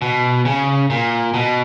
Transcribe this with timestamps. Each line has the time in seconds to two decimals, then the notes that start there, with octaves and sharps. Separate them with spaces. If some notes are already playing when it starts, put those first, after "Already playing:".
0.02 B2
0.45 C#3
0.90 A#2
1.34 B2